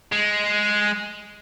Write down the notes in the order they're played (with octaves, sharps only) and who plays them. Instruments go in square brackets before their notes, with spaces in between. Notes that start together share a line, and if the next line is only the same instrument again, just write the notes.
[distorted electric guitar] G#3